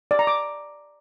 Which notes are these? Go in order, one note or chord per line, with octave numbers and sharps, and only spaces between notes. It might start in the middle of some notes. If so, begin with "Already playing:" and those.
D5
A#5
D6